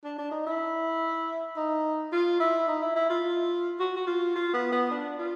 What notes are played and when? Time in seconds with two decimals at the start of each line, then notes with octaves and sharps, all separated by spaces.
0.04 D4
0.18 D4
0.31 D#4
0.46 E4
1.56 D#4
2.12 F4
2.40 E4
2.68 D#4
2.82 E4
2.96 E4
3.10 F4
3.80 F#4
3.96 F#4
4.07 F4
4.36 F4
4.54 B3
4.72 B3
4.91 D4
5.19 F4